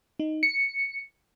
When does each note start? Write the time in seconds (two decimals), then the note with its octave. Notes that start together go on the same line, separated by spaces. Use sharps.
0.20 D#4
0.43 C#7